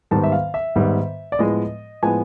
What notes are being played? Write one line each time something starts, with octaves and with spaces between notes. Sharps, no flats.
G#2 D#3 G3 B3 A5
E5
F5
E5
G#2 D#3 G3 B3
D5
A2 F3 G#3 B3 D#5
A2 F3 G#3 B3 G#5